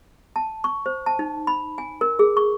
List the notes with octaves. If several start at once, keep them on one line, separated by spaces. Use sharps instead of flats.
A5
C#6
C5
A5
D#4
B5
G#5
A#4
G#4
C#6